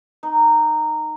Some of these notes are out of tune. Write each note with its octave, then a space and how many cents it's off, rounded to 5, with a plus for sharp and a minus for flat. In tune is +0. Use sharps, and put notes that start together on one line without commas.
D#4 -15